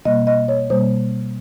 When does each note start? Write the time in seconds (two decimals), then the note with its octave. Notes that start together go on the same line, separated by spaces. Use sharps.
0.05 B2 G3 A#3 D#5
0.27 D#5
0.48 C#5
0.70 B2 G3 A#3 C5